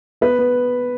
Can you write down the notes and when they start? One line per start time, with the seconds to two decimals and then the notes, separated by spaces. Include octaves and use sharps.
0.21 B3 B4
0.39 B3